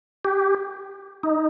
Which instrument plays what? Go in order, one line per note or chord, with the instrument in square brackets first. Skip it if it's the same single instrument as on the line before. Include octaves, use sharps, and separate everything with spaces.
[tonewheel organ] G4
D#4